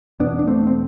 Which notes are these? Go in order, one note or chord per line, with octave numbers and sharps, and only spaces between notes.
E2 B2 B3 D4
D4
A3 C4
C4